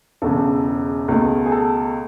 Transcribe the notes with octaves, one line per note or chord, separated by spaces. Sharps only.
E1 E2 C#3 A4
C#2 B2 A3
G#4
A4